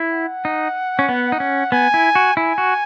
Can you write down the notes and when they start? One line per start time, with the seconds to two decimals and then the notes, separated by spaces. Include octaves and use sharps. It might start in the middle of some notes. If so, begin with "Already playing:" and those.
Already playing: E4
0.12 F#5
0.45 D#4
0.99 C#4
1.09 B3
1.32 D#4
1.40 C#4
1.72 B3 G#5
1.94 E4
2.15 F#4
2.37 E4 G#5
2.58 F#4